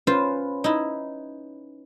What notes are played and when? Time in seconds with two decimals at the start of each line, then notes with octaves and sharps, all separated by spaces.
0.07 C#4 F4 B4 C5
0.64 D#4 E4